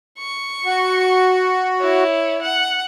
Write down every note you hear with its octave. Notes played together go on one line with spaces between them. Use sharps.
C#6
F#4
E4 C#5
F#5